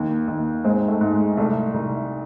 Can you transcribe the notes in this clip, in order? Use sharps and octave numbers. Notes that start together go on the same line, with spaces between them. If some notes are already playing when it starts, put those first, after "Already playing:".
Already playing: D#2
D#2
G#2 G#3 C4
A3
G#2
G#3
C2 A3
C2